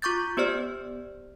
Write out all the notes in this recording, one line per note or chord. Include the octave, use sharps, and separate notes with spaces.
F4 C#6 D6 G6 A6
B3 G4 C5 D5 F6